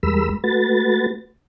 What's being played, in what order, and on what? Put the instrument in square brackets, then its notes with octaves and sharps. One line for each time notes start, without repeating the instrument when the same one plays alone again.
[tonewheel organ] E2 G3 G#3 A#4 B5 E6
A3 F#4 B4 A6